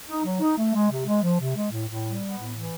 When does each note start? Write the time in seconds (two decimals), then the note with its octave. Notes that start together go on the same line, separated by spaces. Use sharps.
0.08 D#4
0.24 F#3
0.41 D#4
0.58 A3
0.74 G#3
0.91 C3
1.06 G#3
1.22 F3
1.40 C3
1.56 G#3
1.72 A2
1.88 A2
2.04 G3
2.21 B3
2.38 A2
2.55 E3